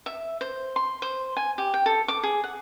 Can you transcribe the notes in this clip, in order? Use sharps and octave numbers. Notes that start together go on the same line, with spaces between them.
E5
C5
C6
C5
G#5
G4
G5
A4
D6
G#4
F#5